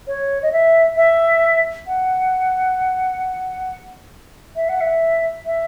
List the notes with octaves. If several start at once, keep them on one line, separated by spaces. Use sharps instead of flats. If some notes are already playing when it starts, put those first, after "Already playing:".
C#5
D#5
E5
E5
F#5
E5
F#5
E5
E5